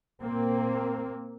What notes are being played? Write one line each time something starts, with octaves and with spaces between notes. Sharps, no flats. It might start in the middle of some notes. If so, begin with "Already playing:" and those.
A#2 A#3 C4